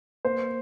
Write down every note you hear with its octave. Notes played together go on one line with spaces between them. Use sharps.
A#3 C5